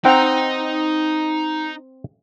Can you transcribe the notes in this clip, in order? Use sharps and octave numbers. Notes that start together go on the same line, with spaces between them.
C4 D#4 F#5 G5 A#5